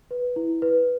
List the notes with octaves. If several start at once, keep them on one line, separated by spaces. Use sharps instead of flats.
B4
E4
B4